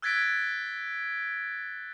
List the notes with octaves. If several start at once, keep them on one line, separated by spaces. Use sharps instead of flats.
E6 F#6 G#6 A6 B6 D7